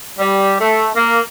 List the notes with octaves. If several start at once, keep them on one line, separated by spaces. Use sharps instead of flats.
G3
A3
A#3